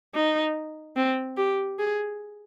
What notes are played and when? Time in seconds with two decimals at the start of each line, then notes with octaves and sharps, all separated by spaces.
0.14 D#4
0.96 C4
1.37 G4
1.79 G#4